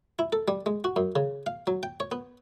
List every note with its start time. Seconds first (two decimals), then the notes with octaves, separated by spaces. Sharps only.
0.19 E4
0.33 A4
0.48 G3
0.66 G#3
0.84 F#4
0.96 F#2
1.16 C#3
1.46 F5
1.67 F#3
1.83 G5
2.00 C#5
2.12 B3